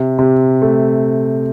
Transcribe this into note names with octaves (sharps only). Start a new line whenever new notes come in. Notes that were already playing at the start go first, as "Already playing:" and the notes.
Already playing: C3
C3
A3